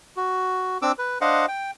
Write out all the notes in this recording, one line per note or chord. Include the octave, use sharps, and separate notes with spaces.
F#4
C4 D4 D6 E6
B4
D4 C5 D#5 F5 F#5
G5